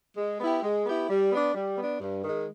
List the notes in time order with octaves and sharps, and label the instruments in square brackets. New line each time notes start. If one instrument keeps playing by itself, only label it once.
[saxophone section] G#3
B3 E4 G4
G#3
B3 E4 G4
G3
B3 D4
G3
B3 D4
G2
D#3 G#3